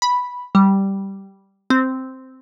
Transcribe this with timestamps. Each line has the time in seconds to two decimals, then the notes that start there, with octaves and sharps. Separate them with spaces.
0.02 B5
0.55 G3
1.70 C4